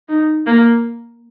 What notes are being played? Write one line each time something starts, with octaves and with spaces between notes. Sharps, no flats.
D#4
A#3